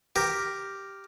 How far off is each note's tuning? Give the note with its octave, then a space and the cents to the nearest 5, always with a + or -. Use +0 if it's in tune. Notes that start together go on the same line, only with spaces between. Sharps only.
G4 +0 A#4 +0